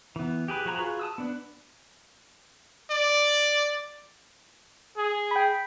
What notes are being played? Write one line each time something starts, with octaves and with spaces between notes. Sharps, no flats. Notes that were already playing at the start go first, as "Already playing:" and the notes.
E3 B3
G4 G#4 B4
F3 F#4 G#4 A#5 B5
F4 F#4 G#4 B4
A5 D#6 E6
B3 D4 B4
D5
G#4
G5 B5